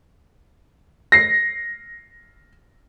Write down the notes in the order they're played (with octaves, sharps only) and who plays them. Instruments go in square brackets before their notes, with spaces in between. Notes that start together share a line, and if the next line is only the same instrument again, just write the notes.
[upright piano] A#6 C7